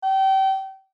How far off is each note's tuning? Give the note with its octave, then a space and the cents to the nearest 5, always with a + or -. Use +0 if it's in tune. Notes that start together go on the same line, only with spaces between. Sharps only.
G5 -30